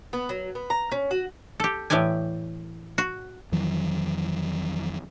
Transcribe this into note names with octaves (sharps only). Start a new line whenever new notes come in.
B3
F#3
B3
A#5
C#4
F#4
G4 A4
A2 E3 G4 D5 G#5
F#4
F2 D#3 E3 F#3